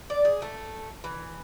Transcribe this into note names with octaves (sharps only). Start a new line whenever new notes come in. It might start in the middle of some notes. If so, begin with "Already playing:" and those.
D5
G#4
A3
E3